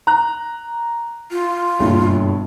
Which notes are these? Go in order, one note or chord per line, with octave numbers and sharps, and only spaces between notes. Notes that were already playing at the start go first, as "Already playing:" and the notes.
A#5 F#6
F4
F#1 G2 B2